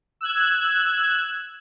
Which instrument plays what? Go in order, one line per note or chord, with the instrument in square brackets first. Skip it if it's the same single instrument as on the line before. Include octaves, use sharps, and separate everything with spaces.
[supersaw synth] E6 F#6 G#6